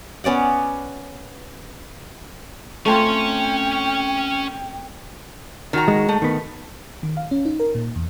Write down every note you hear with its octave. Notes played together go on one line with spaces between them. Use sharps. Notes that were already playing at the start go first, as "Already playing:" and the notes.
B3 C#4 D5 F#5
A3 C4 C#4 F4 G5 G#5
D#3 F#4 A#5
G#3
A3
D#3 B3
D#3
F5
C#4
D#4
A#4
A#2
E2